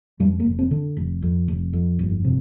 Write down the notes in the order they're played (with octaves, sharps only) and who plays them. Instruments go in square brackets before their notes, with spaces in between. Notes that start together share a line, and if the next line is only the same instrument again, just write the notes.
[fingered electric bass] F2 G3
A#3
F1
C4
D3
F1
F2
F1
F2
G1
C3